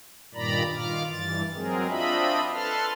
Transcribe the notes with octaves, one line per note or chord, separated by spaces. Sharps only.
G2 A#2 D#3 D5 A#5 B5
D#3 F4 D6 F6
G2 E3 A6
F#3 G#3 C4 G#4 A#4
C4 D4 F4 D#5 E5 B5
A4 B4 A5 C6 F6